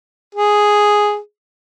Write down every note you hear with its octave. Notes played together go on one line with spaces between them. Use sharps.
G#4